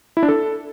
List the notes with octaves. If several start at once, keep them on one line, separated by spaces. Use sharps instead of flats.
E4
D4
A4